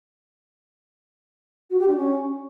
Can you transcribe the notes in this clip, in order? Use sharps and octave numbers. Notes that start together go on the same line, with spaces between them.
F#4
G4
D4
C#4